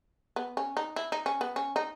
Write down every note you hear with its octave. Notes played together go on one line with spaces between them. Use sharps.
B3
C#4
D#4
E4
D#4
C#4
B3
C#4
D#4